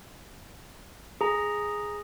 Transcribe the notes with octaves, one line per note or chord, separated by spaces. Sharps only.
G#4 A#5